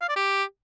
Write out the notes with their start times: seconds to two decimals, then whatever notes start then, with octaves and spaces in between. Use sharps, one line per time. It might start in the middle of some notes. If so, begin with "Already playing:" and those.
0.01 F5
0.09 D5
0.16 G4